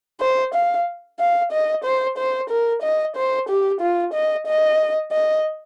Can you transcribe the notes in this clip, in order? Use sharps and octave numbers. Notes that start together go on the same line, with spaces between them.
C5
F5
F5
D#5
C5
C5
A#4
D#5
C5
G4
F4
D#5
D#5
D#5